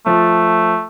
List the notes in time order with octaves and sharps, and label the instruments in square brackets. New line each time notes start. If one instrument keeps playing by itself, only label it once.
[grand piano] F3 [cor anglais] A3